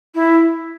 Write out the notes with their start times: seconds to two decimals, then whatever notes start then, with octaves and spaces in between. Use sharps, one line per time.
0.15 E4